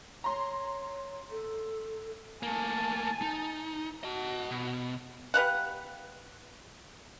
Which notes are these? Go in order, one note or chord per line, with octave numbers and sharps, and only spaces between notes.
C#5 A#5 C6
A4
A3 A#3 G#5 A5
D#4
F#4 D#5 A5
B2
G4 B4 F5 F#5